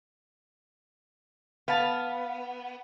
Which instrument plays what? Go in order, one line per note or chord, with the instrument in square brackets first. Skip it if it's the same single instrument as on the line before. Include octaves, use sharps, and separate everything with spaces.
[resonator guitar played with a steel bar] B3 [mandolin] F5 A5